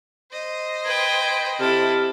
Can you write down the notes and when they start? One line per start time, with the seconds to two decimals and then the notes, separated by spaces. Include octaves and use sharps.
0.32 C5 D#5
0.85 B4 G5 G#6
1.59 C3 E4 A4 F6